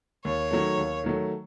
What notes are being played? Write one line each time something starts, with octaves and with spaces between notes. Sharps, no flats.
D#2 C#5
D#3 F#3 A3
D#2
D#3 F#3 A3